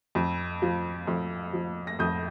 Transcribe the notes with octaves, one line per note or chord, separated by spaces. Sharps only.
F2
F3
F2
F3
A#6
F2 D#6 G6